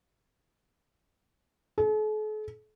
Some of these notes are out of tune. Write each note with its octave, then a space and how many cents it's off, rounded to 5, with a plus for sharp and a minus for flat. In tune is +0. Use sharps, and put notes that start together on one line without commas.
A4 -45